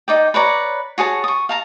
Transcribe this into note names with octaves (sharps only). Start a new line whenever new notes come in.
D#4 D5 G5
B4 C#5 D5 A#5
F#4 G#4 C#5 A5
C#6 D#6
F5 A5 A#5